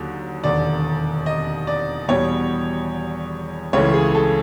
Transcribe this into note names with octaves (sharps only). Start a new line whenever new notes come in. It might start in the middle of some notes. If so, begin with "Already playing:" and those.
Already playing: D#2 D3 F#3
E1 D#2 D3 D5
D#5
D5
E2 B2 G3 C#5
C#2 C#3 E3 A3 C#5
G#4
A4